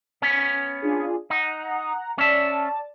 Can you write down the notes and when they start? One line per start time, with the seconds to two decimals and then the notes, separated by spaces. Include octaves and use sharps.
0.22 B3 C#4
0.82 D4 F4 G#4
1.30 D#4 F#5 A#5
2.18 C#4 D5 E5 A5